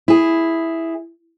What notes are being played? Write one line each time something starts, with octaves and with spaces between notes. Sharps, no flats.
E4 G#4